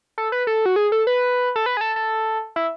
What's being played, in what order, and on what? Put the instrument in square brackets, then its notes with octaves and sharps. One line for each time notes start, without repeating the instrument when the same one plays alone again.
[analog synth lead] A4
B4
A4
F#4
G#4
A4
B4
A4
B4
G#4
A4
A4
E4